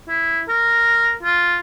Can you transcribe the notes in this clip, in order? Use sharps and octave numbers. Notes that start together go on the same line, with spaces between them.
E4
A#4
F4